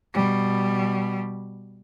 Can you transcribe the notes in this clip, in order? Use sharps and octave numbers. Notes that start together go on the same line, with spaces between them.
B2 G3